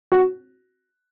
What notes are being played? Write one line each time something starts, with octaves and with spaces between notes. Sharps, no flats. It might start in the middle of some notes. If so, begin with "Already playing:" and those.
F#4